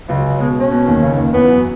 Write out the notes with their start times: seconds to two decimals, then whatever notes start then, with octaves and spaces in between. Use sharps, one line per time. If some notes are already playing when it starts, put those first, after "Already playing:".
0.08 C#2 C#3 F#3
0.39 B2 G#3
0.60 C#4
0.71 B2
0.86 D#2 D#3
1.02 C#2 C#3
1.17 D#2 D#3
1.33 E2 E3 B3
1.48 F#2 F#3